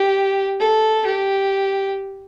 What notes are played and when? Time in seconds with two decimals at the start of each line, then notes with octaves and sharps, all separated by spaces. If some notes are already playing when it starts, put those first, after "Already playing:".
Already playing: G4
0.60 A4
1.06 G4